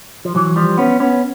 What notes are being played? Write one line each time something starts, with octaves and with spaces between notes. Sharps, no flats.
F3
E3 F#3
F3 G3
B3 C#4
B3 C#4